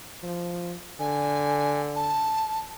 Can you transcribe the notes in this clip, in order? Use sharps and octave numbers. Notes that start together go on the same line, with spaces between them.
F3
D3 G#5
A5